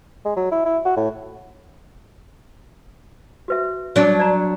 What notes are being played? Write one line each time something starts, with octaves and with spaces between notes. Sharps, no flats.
G#3
F#3
E4
E4
F#4
A2
F#4 B4 E5
F#3 D4
D5 A#5